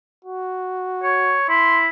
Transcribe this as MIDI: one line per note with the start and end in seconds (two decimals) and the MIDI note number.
0.24 1.40 66
1.03 1.44 73
1.49 1.89 64
1.49 1.82 84